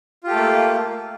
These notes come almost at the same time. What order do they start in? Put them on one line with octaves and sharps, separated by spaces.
F4 G4 A4 A3 A#3